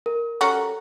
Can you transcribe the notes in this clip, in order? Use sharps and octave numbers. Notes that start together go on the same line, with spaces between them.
A#4
G3 C#4 F#4 A4 A#5